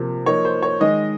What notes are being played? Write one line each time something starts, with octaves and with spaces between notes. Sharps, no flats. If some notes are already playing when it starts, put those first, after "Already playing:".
Already playing: C3 F3 A#3
F3 A#3 D#4 C#5
C5
C#5
D#3 G#3 D#4 D#5